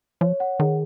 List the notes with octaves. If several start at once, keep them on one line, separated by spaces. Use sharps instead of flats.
F3 C#5
F#5
D#3 G#4